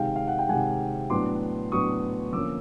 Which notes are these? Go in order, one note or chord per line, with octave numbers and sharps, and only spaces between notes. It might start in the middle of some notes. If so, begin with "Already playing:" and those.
Already playing: C3 D#3 G#3 F5 G5
F5
F#5
G5
C3 D#3 G#3 F#5 G#5
A2 F#3 B3 D4 C6 D6
A2 F#3 B3 D4 C#6 D#6
D3 F3 A#3 C#4 D6 E6